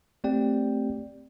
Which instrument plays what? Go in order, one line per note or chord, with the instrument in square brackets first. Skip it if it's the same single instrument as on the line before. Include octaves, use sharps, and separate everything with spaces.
[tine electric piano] A3 C4 G4 D5 G5